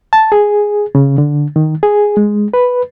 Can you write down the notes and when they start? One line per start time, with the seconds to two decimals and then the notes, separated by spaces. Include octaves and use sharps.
0.13 A5
0.32 G#4
0.95 C#3
1.18 D3
1.56 D#3
1.83 G#4
2.17 G#3
2.54 B4